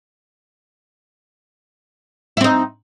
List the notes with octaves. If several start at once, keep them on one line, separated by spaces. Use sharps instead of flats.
C4 D#4 E4